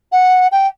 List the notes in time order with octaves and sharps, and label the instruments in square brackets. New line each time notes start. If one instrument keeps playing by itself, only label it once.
[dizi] F#5
G5